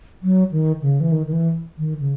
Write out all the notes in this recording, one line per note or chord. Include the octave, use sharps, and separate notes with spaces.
F#3
D#3
C#3
E3
D#3
D#3
E3
D#3
C#3